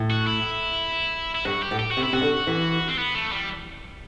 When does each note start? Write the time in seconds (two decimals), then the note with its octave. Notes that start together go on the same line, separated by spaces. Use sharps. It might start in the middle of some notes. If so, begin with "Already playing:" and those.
Already playing: A2
0.10 F#4
0.27 E4
1.35 E4
1.45 G2 F#4
1.62 G4
1.71 A2
1.79 G4
1.91 F#4
1.97 C3
2.03 E4
2.13 C3 F#4
2.22 D3
2.47 E3
2.88 C4
2.98 B3
3.15 A3
3.32 G3